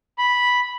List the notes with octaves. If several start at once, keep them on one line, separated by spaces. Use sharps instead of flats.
B5